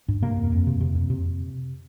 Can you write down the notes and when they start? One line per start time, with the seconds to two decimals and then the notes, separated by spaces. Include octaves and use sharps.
0.08 G2
0.22 C3 A#3
0.37 F2
0.52 F2
0.67 C3
0.80 C3
0.95 F2
1.10 C3